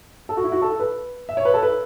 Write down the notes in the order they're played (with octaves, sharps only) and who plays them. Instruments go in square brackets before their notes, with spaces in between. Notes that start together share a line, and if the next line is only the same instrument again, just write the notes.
[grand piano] A4
F#4
E4
F#4
A4
B4
E5
C#5
B4
A4
B4